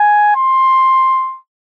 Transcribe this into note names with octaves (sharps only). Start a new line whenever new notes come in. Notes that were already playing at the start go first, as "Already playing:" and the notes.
Already playing: G#5
C6